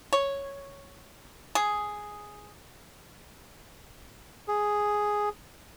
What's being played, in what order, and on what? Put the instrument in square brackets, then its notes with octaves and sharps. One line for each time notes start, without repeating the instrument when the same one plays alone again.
[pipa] C#5
G#4
[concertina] G#4